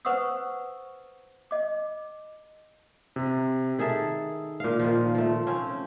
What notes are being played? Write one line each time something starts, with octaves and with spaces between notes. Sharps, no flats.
B4 C5 F#5 C#6 D#6 E6
D#5 D6
C3
D#3 G#4 A4 E5
A#2 F5
D#3 F3
F3 A3
C4 C#4